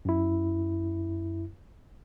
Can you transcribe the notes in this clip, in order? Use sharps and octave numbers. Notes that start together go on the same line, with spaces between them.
F#2 E4